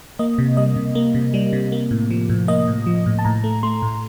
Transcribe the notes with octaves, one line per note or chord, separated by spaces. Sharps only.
A#3 D#5
C3
G3 D#5
C3
A#3
C3
G3
C3
A#3
A2
F3
A2
A#3 D#5
A2
F3
A2
A5
A2 A#5
A3
A3 C6
A2